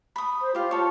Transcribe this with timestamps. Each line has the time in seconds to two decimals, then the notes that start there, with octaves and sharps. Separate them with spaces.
0.16 B5 D#6
0.41 C5
0.55 F4 G4 F5
0.71 A4 C#5